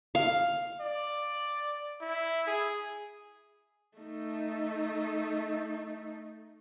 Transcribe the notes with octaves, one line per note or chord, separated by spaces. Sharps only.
F5
D5
E4
G#4
A3 D#4